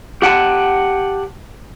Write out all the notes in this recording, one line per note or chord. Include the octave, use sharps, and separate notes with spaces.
G4 F#5 G5 A5